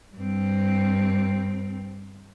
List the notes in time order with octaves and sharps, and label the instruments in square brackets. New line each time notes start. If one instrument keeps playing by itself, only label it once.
[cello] G2 C4